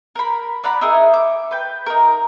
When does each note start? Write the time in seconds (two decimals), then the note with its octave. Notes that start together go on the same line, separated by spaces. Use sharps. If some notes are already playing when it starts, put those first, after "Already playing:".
0.16 A#4 B5
0.64 D5 F#5 A#5 B5
0.81 D#4 E4 G#4 A#4
1.14 D6
1.51 B4 G5
1.86 D#4 A#4